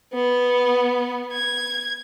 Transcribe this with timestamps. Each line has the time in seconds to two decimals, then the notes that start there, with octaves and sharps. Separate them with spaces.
0.14 B3
1.33 G#6